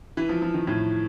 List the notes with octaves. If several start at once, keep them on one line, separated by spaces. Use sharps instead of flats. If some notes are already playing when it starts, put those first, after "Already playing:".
E3
F3
F3
D#3
A2